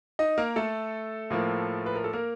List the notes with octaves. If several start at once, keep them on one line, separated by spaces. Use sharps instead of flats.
D#4 D#5
A#3 A#4
A3 A4
A2 F3 A#3
B4
A#4
A4
A#3 A#4